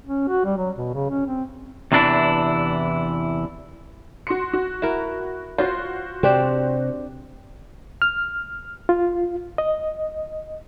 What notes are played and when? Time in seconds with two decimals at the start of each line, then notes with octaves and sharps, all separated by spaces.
0.06 C#4
0.28 F#4
0.45 G3
0.57 F#3
0.76 B2
0.93 C#3
1.10 C#4
1.27 C4
1.92 E2 C3 E3 D4 E4
4.27 F#4 C6 C#7
4.53 F#4
4.82 E4 A#4
5.58 F4 F#4 C5
6.23 C3 C4 D4 G4
8.02 F6
8.89 F4
9.58 D#5